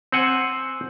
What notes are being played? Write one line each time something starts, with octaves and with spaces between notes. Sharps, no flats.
C4 C5 F#5 G#5